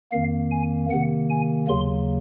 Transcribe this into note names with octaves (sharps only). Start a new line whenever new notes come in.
F2 D#3 A#3 F5
G#5
C3 D#3 A#3 F#5
G#5
D#2 C#3 F#3 A#3 C6